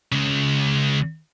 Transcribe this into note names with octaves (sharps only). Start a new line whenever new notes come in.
C#2 C#3